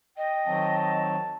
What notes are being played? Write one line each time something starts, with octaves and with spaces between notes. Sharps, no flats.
D#5 G5
D#3 F#3 C4 A5